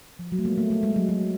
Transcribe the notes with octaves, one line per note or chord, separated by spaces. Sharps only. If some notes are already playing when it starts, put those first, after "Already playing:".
F3
F#3
A3
G#3 A#3
A3 B3
A3
G#3
F#3
F#3